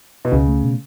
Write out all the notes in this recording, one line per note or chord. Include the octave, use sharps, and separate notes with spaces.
B2
C#2 C#3
A3
B2